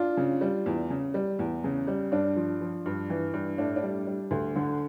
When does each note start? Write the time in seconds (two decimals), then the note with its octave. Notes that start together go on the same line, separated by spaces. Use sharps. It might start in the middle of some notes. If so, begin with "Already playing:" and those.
Already playing: D4 F4
0.17 C#3
0.41 G3
0.66 E2
0.90 C#3
1.14 G3
1.39 E2
1.64 C#3
1.87 G3
2.12 G2 D4
2.36 F3
2.61 F3
2.86 G2
3.10 E3
3.34 G2
3.58 A2 D4
3.76 D4
3.83 G3
4.07 G3
4.31 D2
4.56 D3